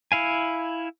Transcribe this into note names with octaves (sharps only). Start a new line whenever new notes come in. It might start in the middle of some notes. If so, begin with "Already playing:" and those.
E4 F5 G#5